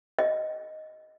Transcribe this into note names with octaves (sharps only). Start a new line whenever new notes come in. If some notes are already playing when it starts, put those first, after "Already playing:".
D#5